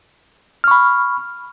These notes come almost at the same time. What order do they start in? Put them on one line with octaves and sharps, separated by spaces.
F6 C#6 B5